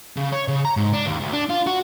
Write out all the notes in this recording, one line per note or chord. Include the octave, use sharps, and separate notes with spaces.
C#3
C#5
C#3
A#5
G#2
D4
D#2
D2
D4
F4
F#4